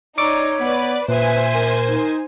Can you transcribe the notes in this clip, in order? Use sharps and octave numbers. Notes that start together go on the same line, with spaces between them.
D#4 C#5 D5 C#6 D6 E6
B3 B4 D5
A#2 B4 C5 E5 G#5
A#4
D#4